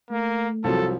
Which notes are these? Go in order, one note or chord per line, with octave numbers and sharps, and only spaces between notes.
A3 A#3
C2 F3 F#3 A4